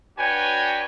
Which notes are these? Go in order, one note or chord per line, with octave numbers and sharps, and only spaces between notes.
D4 F#4 B4 C#5 G5 G#5